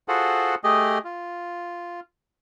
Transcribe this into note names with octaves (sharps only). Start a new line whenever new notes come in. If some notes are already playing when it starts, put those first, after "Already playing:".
F4 F#4 G#4 A4 C5 F#5
A3 G4 G#4 D#5
F4